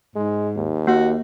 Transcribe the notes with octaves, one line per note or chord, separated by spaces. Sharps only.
G#2 G#3
D#2
A#3 F#4